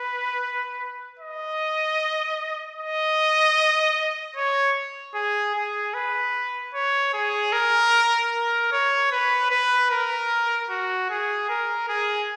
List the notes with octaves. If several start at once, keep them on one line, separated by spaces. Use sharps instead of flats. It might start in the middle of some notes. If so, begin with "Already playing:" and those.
Already playing: B4
D#5
D#5
C#5
G#4
G#4
B4
C#5
G#4
A#4
A#4
C#5
B4
B4
A#4
F#4
G#4
A#4
G#4